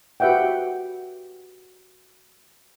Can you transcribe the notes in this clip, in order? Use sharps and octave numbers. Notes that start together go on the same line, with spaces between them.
F#4 G4 B4 E5 F#5 G5